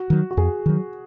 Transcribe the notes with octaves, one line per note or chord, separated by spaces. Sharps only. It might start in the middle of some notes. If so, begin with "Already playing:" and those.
Already playing: F#4
D#3 F#3
F#4
F2 G#4
D#3 F#3